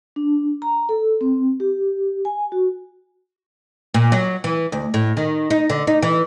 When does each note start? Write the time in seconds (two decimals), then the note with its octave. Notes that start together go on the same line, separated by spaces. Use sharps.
0.16 D4
0.62 A#5
0.89 A4
1.21 C4
1.60 G4
2.25 G#5
2.52 F#4
3.94 A#2
4.12 F#3
4.44 E3
4.72 D2
4.94 A2
5.17 D#3
5.50 D#4
5.70 D3
5.87 D#4
6.02 E3